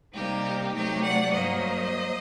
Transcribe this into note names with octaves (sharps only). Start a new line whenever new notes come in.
C3 G3 A#3 D#4 G4
C3 F#3 A3 D#4 G4
D5 F#5
G2 F#3 A#3 C5 D#5